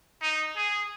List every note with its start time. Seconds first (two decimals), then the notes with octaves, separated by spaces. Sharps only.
0.22 D#4
0.56 G#4